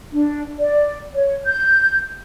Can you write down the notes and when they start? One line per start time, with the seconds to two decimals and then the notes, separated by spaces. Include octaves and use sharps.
0.12 D4
0.59 D5
1.13 C#5
1.46 G6